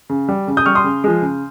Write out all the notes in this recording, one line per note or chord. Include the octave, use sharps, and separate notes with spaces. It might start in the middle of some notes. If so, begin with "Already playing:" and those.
C#3
G3
C#3
D#6 G6
G3 C#6 F6
C6 D#6
C#3
F3 G#3
C#3